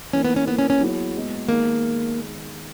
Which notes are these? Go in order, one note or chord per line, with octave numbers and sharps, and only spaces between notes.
E3 A#3 C#4 D#4
B3
C#4
A#3 B3 E4 B4
C#4
C#4
F#3 B3 E4 G#4 C#5
A#2 G#3 B3 F#4
D#3 G#3 A#3 B3 D#4 G#4